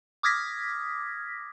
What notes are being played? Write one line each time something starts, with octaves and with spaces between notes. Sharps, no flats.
D6 D#6 F6 G#6 A#6 B6